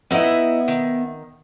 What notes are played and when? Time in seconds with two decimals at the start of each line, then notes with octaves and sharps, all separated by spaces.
0.11 B3 D#4 E4 D#5 E5 F#5
0.68 D#3